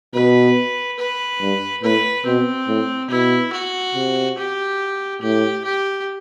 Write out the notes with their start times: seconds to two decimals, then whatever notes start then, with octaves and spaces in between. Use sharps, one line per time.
0.14 B2 B4
0.99 B4
1.41 G2
1.83 A2 B4
2.26 B2 C4
2.68 A2
3.10 B2 E4
3.52 F#4
3.95 C3
4.37 G4
5.22 A2 G4
5.64 G4